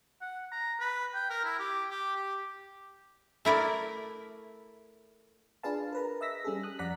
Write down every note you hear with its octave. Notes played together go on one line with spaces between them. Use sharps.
F#5
A#5
B4
G5
A#4
E4
G4
G4
G4
A3 E4 A#4 D5
D4 F4 G#4 B4 F5 A5
A#4 B4 A#5
D#5 E5 E6 A#6 B6
G3 C#4 G#4 A4
D#6 F#6
F2 D5 F#5 A#5 F#6 B6